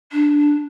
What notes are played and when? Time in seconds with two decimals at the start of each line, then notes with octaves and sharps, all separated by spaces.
0.12 D4